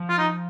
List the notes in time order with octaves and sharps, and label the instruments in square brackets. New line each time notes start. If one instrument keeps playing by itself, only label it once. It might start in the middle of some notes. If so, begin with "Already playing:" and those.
Already playing: [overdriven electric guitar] F3
[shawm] F4
D#4